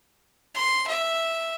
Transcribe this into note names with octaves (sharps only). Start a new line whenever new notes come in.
C6
E5